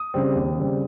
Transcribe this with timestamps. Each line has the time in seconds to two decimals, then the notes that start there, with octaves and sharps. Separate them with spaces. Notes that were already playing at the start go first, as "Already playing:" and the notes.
Already playing: D#6
0.14 C#3 G3 C4
0.35 D#2
0.59 C#3 G3 C4